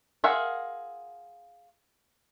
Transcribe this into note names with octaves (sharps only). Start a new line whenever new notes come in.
F4 G#4 A#4 E5 F#5